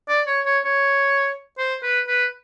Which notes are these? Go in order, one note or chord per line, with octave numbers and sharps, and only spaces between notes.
D5
C#5
C#5
C#5
C5
B4
B4